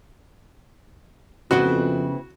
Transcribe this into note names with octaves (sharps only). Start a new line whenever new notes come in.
F2 C#3 E3 B3 C4 F#4